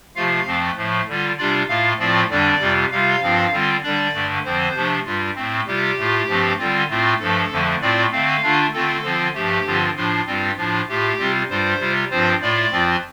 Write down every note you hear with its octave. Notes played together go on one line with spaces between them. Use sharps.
C3 F3 A3 F4 F5
F2 F3 A3 C4
A2 F3 A3
D3 G3 F4
C3 G3 D4 F4 D5
A2 A3 F4 F5
A2 F3 A3 C4 F4 D5
F2 D3 G3 D4 D5
F2 C3 G3 F4
C3 G3 F4 F5
G2 F3 C4 F4
D3 G3 C4 F4
D3 G3 D4 D5
G2 D3 A3
F2 D3 F3 C4 C5
C3 F3 A3 D4
G2 G3 F4
A2 A3 C4
C3 G3 F4 G4
A2 A3 F4
G2 F3 A3 C4
D3 G3 C4 F4
A2 A3 C4 F4
G2 F3 A3 A4
F2 D3 F3 A3
A2 A3 C4 F4 D5
D3 A3 C4 F5
D3 A3 D4 F4
D3 A3 C4 F4 A4
D3 F3 C4 F4
G2 F3 A3 G4
G2 D3 F3 C4 F4
A2 F3 D4 F4
G2 G3 C4 F4
A2 F3 D4 F4
A2 A3 F4 G4
C3 G3 C4 F4
G2 G3 F4 C5
C3 G3 F4
G2 F3 C4 F4 C5
A2 A3 F4 D5
F2 F3 C4 F4